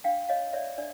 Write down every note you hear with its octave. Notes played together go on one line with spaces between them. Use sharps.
D4 F5 G5
C#5 D#5 F5
C#5 D5 E5
D4 D5